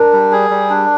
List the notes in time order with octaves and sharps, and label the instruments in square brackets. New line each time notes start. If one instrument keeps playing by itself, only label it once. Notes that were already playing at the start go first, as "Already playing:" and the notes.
Already playing: [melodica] D4 [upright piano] A#4
[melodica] G3
G#4
G3
D4